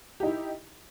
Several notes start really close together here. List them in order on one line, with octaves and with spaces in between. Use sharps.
G4 D#4 E4